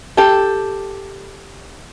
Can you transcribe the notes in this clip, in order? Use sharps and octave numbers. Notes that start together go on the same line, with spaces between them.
G4 A4